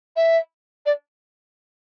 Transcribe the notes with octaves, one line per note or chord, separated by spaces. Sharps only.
E5
D5